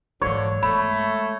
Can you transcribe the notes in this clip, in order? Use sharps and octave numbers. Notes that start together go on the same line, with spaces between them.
G#2 D3 E3 C#5
G#3 A3 B3 B5